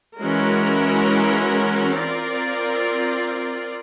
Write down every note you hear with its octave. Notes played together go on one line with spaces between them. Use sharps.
E3 G#3 C#4 F#4 A#4
C4 F4 A#4 D5